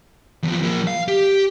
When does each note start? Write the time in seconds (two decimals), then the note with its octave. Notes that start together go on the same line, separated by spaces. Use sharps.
0.43 E2 F3
0.63 F3 A#3
0.87 F5
1.08 G4